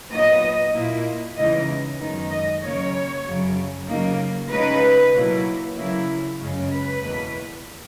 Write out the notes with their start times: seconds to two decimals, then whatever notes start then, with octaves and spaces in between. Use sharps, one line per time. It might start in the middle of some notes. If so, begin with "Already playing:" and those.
0.11 A#2 F#3 B3 D#4 D#5
0.74 A#2 A#3 E4
1.36 E2 C#3 E3 G#3 D#4 D#5
1.99 F#2 D#3 G#3 B3 D#4
2.30 D#5
2.62 C#3 F#3 A#3 C#5
3.25 F#2 C#3 F#3
3.88 C#3 F#3 A#3 D#4
4.50 C#3 G#3 D#4 B4
5.13 B2 F#3 A#3 E4
5.76 C#3 F#3 A#3 E4
6.39 F#2 C#3 G#3 C#4
6.70 B4
7.02 E2 B2 A#3